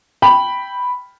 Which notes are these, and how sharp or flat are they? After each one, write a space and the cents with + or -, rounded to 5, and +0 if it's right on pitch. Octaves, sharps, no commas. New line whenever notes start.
G5 +0 B5 +0